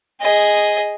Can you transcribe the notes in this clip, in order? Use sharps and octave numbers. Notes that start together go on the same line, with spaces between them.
G#4 D#5